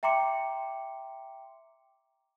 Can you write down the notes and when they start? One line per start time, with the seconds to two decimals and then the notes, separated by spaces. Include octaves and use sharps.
0.03 E5 G5 A#5 C6 D6 C#7